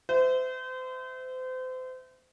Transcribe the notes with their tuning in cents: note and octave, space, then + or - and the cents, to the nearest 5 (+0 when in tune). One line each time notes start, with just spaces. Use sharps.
C5 -35 E5 -5